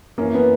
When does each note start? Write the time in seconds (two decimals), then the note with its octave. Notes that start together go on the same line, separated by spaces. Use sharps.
0.18 F#2 E3 A#3 C#4
0.35 B3